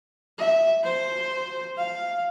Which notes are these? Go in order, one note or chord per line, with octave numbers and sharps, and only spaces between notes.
E5
C5
F5